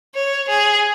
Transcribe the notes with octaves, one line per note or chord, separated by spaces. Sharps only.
C#5
G#4